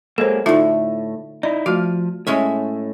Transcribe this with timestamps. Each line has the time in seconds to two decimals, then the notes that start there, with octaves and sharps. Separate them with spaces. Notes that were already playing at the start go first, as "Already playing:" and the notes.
0.18 F#3 G#3 A#3 A4 C5
0.46 A2 D3 A3 D#4 F4
1.43 D#4 E4 D5
1.66 F3 A3 F#4 F5
2.27 A2 G#3 C#4 E5